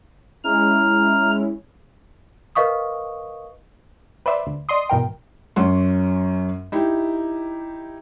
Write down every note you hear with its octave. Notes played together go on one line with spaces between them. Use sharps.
G#3 C#4 E4 A#5 F6
A#4 B4 D#5 F5 C#6 D#6
B4 C5 D5 E5
D2
D5 D#5 C6 D#6
G#2 B2 E3 A#4 G5
F#2 C#4 F#5 C6
D#4 E4 G4